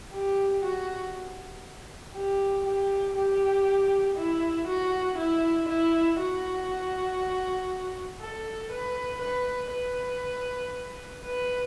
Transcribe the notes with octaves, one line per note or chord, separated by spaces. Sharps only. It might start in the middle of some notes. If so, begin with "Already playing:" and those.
G4
F#4
G4
G4
G4
E4
F#4
E4
E4
F#4
A4
B4
B4
B4
B4